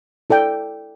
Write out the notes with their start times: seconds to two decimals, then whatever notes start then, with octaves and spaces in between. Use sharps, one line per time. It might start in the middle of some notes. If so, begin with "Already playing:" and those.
0.30 E4 A4 D5 G5